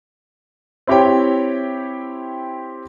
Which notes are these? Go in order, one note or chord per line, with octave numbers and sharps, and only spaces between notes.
C4 E4 G4 C#5 G5